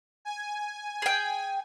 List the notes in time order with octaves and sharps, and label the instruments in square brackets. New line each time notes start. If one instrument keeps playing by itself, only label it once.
[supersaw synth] G#5
[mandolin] G#4 G5